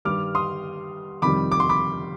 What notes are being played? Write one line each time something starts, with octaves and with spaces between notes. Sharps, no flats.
G2 D#3 G3 D6 F6
C6 D#6
F2 C3 D#3 G3 B5 D6
D6
C6
B5 D6